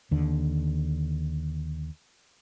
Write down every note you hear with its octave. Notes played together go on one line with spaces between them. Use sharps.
D#2 D3